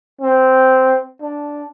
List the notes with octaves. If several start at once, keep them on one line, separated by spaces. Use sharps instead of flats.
C4
D4